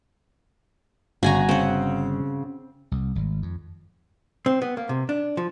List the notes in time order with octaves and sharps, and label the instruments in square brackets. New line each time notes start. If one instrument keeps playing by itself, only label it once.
[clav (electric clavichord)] G1 [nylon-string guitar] C#3 [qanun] F#4 G#5 A#5
[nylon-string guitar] C#3 [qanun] C4 F#5
[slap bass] C2
G#1
F2
[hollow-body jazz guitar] C4
B3
A#3
C3
D4
F3